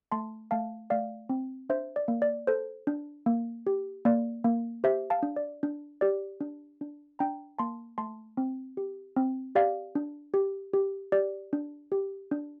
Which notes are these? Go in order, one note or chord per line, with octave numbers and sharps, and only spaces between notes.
A3 A5 C6
A3 F5 A5
A3 D5 F5
C4
D4 C5 E5
D5
A#3
D5
A4 C5
D4
A#3
G4
A#3 D5
A#3
G4 C5 E5
F5 A5
D4
D5
D4
G4 D5
D4
D4
D4 G5 A#5
A#3 A5 C6
A3 A5 C6
C4
G4
C4
G4 D5 F5
D4
G4
G4
G4 D5
D4
G4
D4